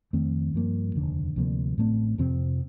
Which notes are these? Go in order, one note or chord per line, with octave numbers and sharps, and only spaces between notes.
F2 D#3 A3 C4
G2 F3 A#3
F1 D#2 D3
D2 C3 F3 A#3
A1 A2 A3 C4
F2 C3 F3 C4